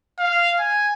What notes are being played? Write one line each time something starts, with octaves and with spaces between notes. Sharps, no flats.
F5
G#5